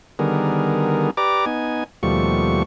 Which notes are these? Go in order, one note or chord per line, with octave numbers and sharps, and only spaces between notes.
D3 D#3 G3 B3 G#4 A#4
G4 B4 D5 A#5 D6
B3 D#4 G#5
D#2 B2 F3 G3 A3 C#6